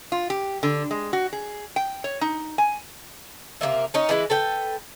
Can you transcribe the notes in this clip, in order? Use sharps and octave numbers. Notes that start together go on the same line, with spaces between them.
F4
G4
D3
G#3
F#4
G#4
G5
C#5
D#4
G#5
C3 G#3 A#3 E5
C#4 D#4
E3 G#3 E4 B4
A4 B4 G5